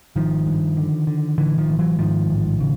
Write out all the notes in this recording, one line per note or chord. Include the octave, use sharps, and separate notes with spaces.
G#1 D#3 F3
G2
D3
D3
A1 D3 E3
D#3 F3
A1
E3 F#3
G#2 D#3 F3
A1
C#3